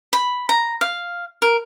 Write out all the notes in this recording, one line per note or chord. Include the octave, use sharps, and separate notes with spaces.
B5
A#5
F5
A#4